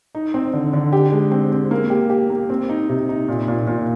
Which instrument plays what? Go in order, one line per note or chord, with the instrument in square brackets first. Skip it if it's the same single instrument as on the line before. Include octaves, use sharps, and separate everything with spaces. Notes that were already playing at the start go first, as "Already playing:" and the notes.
[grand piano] D#4
C4
D3
D3
G4
G#3
C4
C4
A#3
G4
G4
A#3
C4
D#4
C3
D#4
A#2
A#2
A#2